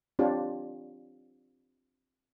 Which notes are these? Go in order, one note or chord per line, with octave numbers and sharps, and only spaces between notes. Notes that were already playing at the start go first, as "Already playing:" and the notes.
C4 D4 F4 G4 C#5